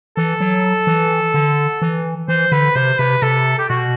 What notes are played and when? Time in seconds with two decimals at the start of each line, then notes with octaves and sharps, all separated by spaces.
0.17 E3 A4
0.40 F#3
0.87 E3
1.34 D3
1.82 E3
2.28 E3 C5
2.52 D3 B4
2.76 C3 C5
2.99 C3 B4
3.22 C3 A4
3.59 G4
3.69 B2 F#4